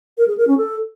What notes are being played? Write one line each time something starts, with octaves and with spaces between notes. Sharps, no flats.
A#4
G#4
A#4
C#4
A4